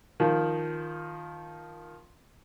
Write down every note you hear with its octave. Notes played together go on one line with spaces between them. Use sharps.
D#3 F3